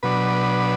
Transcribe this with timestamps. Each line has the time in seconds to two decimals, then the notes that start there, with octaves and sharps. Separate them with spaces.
0.03 B2 F#3 D4 B4